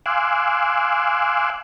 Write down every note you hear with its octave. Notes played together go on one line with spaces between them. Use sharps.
F5 G#5 C6 D6 E6 F#6